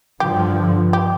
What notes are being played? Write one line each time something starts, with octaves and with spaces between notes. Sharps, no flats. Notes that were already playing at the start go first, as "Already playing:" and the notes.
G2 D3 F3 G4
G4